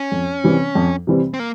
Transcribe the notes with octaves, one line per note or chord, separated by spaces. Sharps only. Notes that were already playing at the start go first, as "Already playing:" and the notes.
Already playing: C#4
F2
C3 E3 G3 C4
F2
C3 E3 G3 C4
C4
A#3